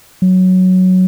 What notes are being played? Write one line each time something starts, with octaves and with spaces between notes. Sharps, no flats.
F#3